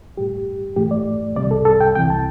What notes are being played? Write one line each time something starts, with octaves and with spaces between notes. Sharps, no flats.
A2 G3 G4
A2 E3 A3 G4
D5
C2 C3 G3 D5
A4
A4
G5
C2 C3 E3 G5
A5